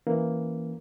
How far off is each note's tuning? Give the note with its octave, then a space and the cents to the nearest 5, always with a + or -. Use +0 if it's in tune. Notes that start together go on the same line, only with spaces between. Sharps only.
E3 +0 A#3 +0 C#4 -5